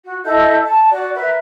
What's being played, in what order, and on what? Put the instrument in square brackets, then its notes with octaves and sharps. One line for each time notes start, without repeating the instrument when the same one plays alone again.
[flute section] F#4
E4 A4 D#5 G6
A5
F#4 D5
A#4 B4 E5